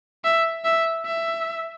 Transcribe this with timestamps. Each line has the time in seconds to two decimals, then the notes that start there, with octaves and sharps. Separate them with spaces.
0.24 E5
0.65 E5
1.06 E5